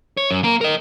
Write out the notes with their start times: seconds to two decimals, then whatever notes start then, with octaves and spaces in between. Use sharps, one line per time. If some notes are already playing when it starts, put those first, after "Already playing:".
0.17 C#5
0.31 F#2
0.44 A#3 A#4
0.61 A#4 D#5